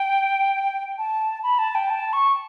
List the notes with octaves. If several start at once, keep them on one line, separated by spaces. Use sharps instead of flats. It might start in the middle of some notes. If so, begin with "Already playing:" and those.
Already playing: G5
A5
B5
A5
G5
A5
C#6